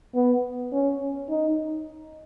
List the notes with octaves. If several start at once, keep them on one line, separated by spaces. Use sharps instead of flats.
B3
C#4
D#4